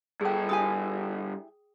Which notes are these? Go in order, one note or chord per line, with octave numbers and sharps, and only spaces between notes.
G2 G#4 A4 G5
E4 G4 G#5 D#6